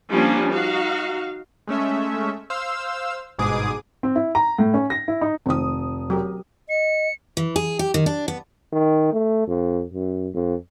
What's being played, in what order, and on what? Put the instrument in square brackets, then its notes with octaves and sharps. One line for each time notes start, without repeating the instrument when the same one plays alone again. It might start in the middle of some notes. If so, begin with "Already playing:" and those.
[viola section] F3 G3 A#3 C#4 D4
D#4 F#4 F5
[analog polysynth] G#3 A3 C#4 E5
C5 F5 E6
G1 G#2 B2 G#4 D6 D#6
[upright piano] C4
E4
A#5
A2
C#4
A#6
E4
D#4
[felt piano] F1 D#6 [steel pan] D#3 C4
[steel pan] F#3 G4 A#4
[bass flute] D#5 [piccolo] C#7
[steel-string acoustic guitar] E3
G#4
G4
D#3
D4
B3
[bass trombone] D#3
A3
F2
F#2
F2